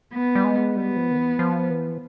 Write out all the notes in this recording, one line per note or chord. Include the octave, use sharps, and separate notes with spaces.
B3
G3
G#3
G3 B3
F3
D#3
E3
F3
E3